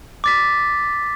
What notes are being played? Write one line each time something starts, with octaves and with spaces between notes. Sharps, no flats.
D6 A6 B6